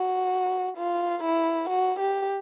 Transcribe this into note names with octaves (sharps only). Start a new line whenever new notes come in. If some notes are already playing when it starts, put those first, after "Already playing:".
Already playing: F#4
F4
E4
F#4
G4